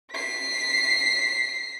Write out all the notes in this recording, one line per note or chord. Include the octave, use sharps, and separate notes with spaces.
B6 C7